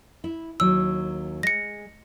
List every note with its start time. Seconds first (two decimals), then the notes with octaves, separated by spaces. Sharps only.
0.24 E4
0.60 D#2 F#3 E6
1.43 G#3 A#6 C#7